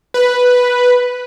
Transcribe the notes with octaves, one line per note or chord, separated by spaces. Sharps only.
B4